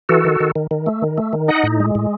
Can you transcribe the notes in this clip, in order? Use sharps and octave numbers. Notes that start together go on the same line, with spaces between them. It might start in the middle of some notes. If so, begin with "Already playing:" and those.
E3 F#4 A4
D#3
D#3
D#3
D#3
A3
D#3
A3
D#3
D#4 D#5 F#5
A2
G#3
A2